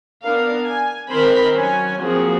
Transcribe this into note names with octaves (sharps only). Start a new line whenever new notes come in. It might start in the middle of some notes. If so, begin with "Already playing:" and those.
B3 D4 A#4 F5
G#5
D#3 C4 A#4 C5 B5
F#3 C#4 G#5
F3 A#3 C4 F#4 G#4